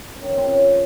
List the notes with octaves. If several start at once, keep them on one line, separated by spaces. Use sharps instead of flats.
C#4
D#3
F3
C4
C#3